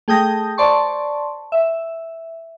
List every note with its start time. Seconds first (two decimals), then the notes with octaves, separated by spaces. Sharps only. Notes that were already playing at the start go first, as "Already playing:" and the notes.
0.08 A3 G#4 G5 D#6 G6 A#6
0.58 C5 D5 A5 C6 C#6
1.52 E5